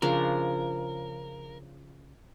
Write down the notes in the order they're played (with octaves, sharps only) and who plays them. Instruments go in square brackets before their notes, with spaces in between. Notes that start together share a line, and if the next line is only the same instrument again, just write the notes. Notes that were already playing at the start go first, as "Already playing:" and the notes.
[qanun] C#3 F3 D4 [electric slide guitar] A#4